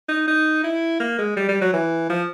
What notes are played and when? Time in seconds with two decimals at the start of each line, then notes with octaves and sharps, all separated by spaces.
0.09 D#4
0.28 D#4
0.64 E4
1.00 A#3
1.19 G#3
1.37 G3
1.49 G3
1.62 F#3
1.73 E3
2.10 F3